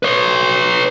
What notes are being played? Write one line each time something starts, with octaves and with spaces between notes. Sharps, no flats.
B4 C#5